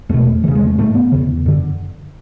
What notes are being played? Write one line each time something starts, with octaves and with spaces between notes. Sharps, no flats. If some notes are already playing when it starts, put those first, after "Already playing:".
E2 B2 A3
E2 C#3 E3
G#3
A3
G#2 A3
B3
E2 C#3
F#2 D3